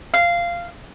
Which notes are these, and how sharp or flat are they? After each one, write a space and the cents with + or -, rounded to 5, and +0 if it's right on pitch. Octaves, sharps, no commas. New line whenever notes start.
F5 -15